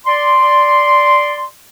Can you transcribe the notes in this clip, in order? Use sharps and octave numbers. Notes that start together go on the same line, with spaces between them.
D5 C6